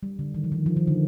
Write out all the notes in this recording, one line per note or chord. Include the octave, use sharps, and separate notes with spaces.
G3
D3
D#3
F3
D#3
F3
D#3
D3